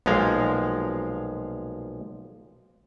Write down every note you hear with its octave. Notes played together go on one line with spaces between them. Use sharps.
B1 A#2 F3 G#3 F5